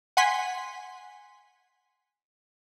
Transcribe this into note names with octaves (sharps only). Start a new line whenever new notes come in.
F#5 G#5 C6 B6